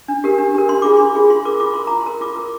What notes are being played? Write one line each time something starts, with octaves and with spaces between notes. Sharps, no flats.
D4
G4 A#4
D4
G4 A#4
D4 C6
F4 G#4 D6
D4 C6
F4 G#4
F4 C6
A#4 D6
F4 D6
A#4 C6
F4 A#5
C6
A#4
F4 D6
A#4